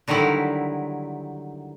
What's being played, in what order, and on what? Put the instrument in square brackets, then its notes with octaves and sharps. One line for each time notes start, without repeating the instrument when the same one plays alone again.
[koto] D3 D#3 F#3 G3 E4